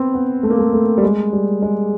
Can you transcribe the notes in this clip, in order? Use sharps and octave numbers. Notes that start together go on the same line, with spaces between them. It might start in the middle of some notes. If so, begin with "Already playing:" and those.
Already playing: B3 C4
B3
A3
A#3
A3
A3
G3
G#3
G3
G#3